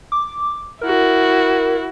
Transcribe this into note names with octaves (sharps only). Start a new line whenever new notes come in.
D6
E4 F#4 A#4